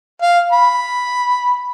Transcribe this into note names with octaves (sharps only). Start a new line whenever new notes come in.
F5
B5